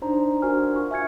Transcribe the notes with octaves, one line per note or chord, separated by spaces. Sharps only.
D4 D#4 C5 A#5
D4 F#4 A#4 C5 G#5 F6
F4 C#6
E5 G#5 F6 G#6 C#7